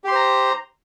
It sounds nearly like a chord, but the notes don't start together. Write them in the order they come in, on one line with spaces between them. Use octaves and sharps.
G4 C6 C5 A#5